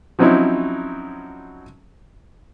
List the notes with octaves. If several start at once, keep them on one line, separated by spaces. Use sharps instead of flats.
F3 F#3 C4 C#4 D#4 E4